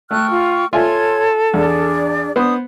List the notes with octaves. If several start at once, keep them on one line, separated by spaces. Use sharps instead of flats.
A3 G5 C#6 F6 F#6
F4
F4 A4 C#5 E5 G#5 C6 G#6
E2 D4 G#4 D5
B3 D4 C5 D#6